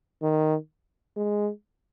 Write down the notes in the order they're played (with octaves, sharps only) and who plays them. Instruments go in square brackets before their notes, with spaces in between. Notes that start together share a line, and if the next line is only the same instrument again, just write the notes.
[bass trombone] D#3
G#3